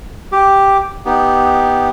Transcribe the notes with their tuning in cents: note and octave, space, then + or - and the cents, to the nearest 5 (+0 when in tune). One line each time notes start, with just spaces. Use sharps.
G4 +0 D6 +0
B3 +0 D#4 +0 G4 +0